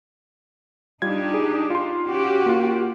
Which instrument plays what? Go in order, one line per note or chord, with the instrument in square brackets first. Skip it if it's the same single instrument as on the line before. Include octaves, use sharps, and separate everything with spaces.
[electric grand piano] G3 F4 G#6 [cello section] D4 D#4 G4
[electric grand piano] G#4
F4 C6
[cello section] C#4 F#4 G4
[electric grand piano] A#3 F4